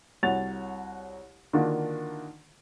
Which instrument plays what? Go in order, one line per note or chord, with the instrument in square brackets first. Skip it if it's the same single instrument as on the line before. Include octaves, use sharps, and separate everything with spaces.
[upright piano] C2 F#4 C#5 A6 F7
D3 D#3 A#3 D4 F4 F#4